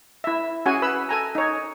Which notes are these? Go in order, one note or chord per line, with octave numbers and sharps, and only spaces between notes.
E4 E5
C#4 F#4 G#4 F#5 G#5
B4 B5 E6
A4 G#5 A#5
D#4 C#5